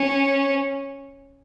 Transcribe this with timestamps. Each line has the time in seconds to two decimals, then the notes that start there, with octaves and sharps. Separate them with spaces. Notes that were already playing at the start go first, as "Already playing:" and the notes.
Already playing: C#4